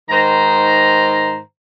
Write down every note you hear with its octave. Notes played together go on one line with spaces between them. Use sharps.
G#2 D#3 C5 A#5